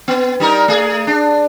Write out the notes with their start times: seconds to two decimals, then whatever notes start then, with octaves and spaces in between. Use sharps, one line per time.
0.08 B3
0.40 G3 D#4 A#4
0.68 A3 G#4
1.07 D4